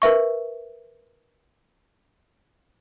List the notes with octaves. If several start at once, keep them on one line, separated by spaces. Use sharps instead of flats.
A#4 B4 E5 C#6